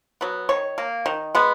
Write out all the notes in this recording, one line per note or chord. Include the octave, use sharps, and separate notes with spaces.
F#3 B3
D#3 C#5
A#3
D#3
G#3 B3